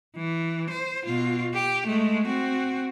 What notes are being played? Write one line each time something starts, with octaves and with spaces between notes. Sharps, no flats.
E3
C5
B2 F4
G4
G#3 A3
C4 F#4